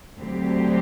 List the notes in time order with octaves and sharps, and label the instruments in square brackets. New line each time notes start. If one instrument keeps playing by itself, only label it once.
[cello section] D2 D3 F#3 C4 G4